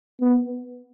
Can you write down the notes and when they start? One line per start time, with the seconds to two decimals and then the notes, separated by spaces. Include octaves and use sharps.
0.21 B3